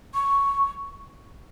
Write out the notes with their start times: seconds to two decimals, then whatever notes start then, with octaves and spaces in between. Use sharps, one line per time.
0.14 C#6